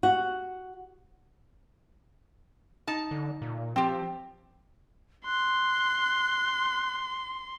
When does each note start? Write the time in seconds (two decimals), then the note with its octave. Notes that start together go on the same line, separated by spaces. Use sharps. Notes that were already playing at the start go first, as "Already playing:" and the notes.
0.03 F#4
2.87 D#4 A5
3.11 D3
3.42 A#2
3.76 F3 C4 G4 G5
5.25 C6 F#6